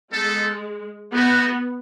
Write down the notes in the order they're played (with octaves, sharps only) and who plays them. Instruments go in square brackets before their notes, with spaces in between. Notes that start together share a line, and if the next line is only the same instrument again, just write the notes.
[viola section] G#3 [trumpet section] B3 D#4 A4
[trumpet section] A3 D#4 F#4 [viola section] B3